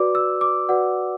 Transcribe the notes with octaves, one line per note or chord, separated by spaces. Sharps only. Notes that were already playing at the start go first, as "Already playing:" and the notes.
Already playing: F#4 B4 D5 D6
E6
D6
F#4 B4 D5 F#5